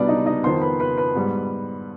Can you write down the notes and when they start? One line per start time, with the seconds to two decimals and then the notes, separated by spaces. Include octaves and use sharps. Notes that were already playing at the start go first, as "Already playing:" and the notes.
Already playing: C2 B2 G3 B3 D4 B4 D5
0.08 D#4 D#5
0.26 D#4 D#5
0.44 F2 D#3 B3 C5 C6
0.62 B4 B5
0.80 B4 B5
0.98 B4 B5
1.15 G#2 G3 B3